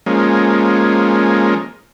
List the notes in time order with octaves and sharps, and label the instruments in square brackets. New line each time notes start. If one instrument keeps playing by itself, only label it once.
[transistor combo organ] F3 G#3 A#3 C#4